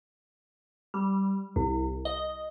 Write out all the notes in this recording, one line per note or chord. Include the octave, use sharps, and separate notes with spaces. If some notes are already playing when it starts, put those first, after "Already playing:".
G3
C2
D#5